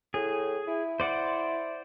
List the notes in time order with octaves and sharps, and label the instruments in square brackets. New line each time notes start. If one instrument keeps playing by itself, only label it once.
[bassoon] A2 [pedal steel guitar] G#4
[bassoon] E4
[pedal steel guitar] C5 D5 F#5